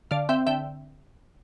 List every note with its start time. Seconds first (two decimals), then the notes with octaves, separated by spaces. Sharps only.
0.11 D3 D5 F5
0.29 C4 E5 G5
0.47 D3 E5 G5